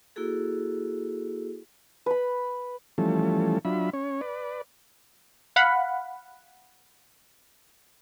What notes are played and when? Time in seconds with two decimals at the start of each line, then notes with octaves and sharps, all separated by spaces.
0.16 A#3 E4 F#4 G#4 A4
2.06 B4 B5
2.98 E3 F3 G3 A3 C#4 A4
3.65 F#3 D4 F4 E5 B5
3.93 C#4 C#5
4.21 B4 D5
5.56 F5 F#5 B5